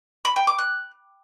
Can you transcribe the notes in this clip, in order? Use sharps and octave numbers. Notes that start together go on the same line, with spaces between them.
B5
G5
D6
F#6